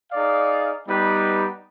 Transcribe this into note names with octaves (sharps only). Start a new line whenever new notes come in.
D#4 G#4 D5 F5
G3 B3 D#4 G4 B4